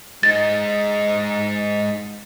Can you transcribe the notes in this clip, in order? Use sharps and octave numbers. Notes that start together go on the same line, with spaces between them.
G#3 D#4 A6